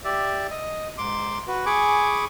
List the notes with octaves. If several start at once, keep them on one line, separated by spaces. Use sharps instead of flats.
G4 D5 E5
D#5
G#2 C6 D6
F#4 B4
G#4 G#5 B5 C#6 D6